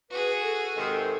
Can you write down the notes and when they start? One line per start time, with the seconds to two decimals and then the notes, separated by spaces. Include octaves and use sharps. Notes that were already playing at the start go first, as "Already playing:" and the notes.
0.11 F#4 G#4 B4
0.42 A4
0.77 G#2 C3 D#3